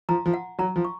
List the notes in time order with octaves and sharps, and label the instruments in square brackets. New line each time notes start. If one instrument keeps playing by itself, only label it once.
[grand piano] F3 [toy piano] A#5
[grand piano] F3
[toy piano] F#5
[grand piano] F#3 [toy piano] A#5
[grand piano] F3
[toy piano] C#6